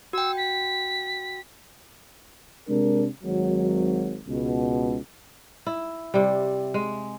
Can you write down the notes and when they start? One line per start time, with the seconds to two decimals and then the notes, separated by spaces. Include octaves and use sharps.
0.13 F#4 G5 E6
0.37 B6
2.68 C3 G#3 D4 A#4
3.23 G#1 F#3
4.27 C#2 B2
5.67 E4
6.14 C3 G3
6.74 G#3